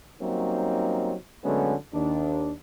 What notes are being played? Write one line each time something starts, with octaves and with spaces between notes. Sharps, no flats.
F#3 G3 A#3 C4 C#4 D#4
D3 F#3 G#3 A3 B3 C#4
D#2 D4